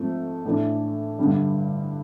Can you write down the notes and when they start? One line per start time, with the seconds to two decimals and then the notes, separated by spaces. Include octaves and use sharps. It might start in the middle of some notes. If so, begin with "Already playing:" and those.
Already playing: G#2 F3 A3 C4
0.45 A2 E3 A3 D4
1.18 G2 D3 G3